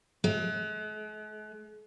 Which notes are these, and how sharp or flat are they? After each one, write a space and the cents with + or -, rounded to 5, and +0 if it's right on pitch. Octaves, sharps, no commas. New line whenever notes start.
G#3 +45